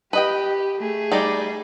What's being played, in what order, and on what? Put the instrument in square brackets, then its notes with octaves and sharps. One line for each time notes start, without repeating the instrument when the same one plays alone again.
[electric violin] G4 [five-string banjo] B4 D#5 G5
[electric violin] A3 G#4
[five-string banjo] G3 D#4 D5